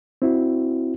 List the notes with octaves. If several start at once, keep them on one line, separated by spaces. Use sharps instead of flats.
C4 E4 F#4